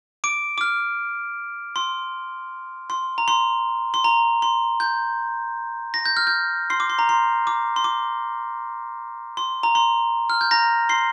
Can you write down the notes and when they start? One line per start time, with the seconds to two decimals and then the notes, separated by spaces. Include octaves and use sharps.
0.24 D6 D7
0.58 D6
0.61 F6
1.76 C6
2.90 C6
3.18 A#5
3.28 C6
3.94 C6
4.04 A#5
4.42 C6
4.80 G6
5.94 A#6
6.06 G6
6.17 F6
6.27 G6
6.70 C6 C7
6.80 D6
6.90 C6
6.99 A#5
7.09 C6
7.47 D6
7.76 C6
7.84 D6
9.37 C6
9.63 A#5
9.75 C6
10.30 F6
10.41 G6
10.51 A#5 A#6
10.89 C6 C7